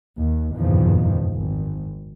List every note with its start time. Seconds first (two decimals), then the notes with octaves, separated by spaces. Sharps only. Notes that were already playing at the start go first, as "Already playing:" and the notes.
0.19 D#2
0.57 F#1 E2 G2 A#2 D#3 F3
1.34 G#1